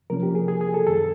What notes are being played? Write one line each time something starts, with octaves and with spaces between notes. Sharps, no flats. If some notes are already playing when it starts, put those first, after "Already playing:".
C3 F3 A#3 C#4 A#4
G4
G#4
G#4
G#4
A4
F#2 D#3 G3 A4